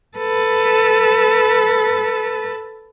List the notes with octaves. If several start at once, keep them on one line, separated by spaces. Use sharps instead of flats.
A4 B4